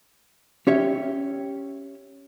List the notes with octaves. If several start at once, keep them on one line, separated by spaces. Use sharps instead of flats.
C#4 G4 C#5 E5